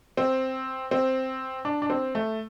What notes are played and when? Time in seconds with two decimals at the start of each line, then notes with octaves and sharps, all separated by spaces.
0.17 C4
0.91 C4
1.65 D4
1.82 D4
1.90 C4
2.15 A3